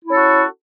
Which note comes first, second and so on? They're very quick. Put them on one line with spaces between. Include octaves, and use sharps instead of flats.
E4 C#4 A4 F#4